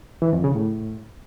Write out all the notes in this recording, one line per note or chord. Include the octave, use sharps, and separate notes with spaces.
E3
F2
C#3
A2